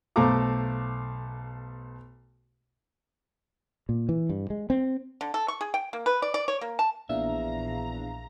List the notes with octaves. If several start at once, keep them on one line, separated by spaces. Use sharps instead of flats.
B1 A3 C5 F5 A#5 D6
A#2
E3
G2
G#3
C4
D3
A4
C#6
G#4
G5
A#3
B4
D5
D5
C#5
A#3
A5
A#1 E2 A#2 D4 E5 F5 A#5